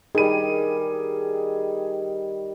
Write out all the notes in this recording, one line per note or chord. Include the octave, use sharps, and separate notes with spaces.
D#3 G3 G#4 D#7